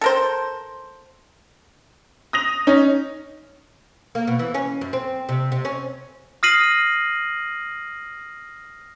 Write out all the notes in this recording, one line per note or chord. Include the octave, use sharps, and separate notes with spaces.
A4 A#4 C5
D#6 A#6 F7
C#4 D#4
A#3
B2
E3
C#4
F#2
C4
C3
C3
C#4
D#6 F6 A#6 C7 D#7 F#7